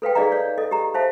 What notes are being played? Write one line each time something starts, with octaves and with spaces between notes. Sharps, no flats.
A4 B4 F5 G5
D#4 G#4 D5 D#5 F5 A#5
C#5 D5 F5
A4 D#5
G4 A#5
C5 E5 F5 A5